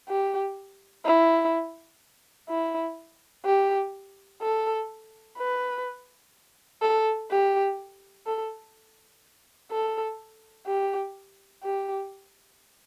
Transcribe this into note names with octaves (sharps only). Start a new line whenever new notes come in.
G4
E4
E4
G4
A4
B4
A4
G4
A4
A4
G4
G4